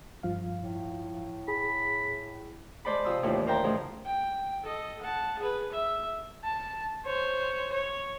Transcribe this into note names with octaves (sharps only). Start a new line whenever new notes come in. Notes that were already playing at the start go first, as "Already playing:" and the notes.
G2 F3 F5
A2
G#4 B5
G#3 C5 D5 A5 B5
C3 F3 F4 D#6 E6
D#2 A2 E3 F3 G3 D4
A#4 C5 E5 G5 A5 A#5
G#2 C#3 E3 F3 A3
G5
A4 D#5
F#5 A5
G#4 B4
E5
A5
C5 C#5
C#5